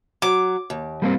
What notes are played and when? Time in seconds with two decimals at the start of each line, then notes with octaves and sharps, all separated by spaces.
0.22 F#3 D6
0.70 D#2
1.02 G3 A#3 C4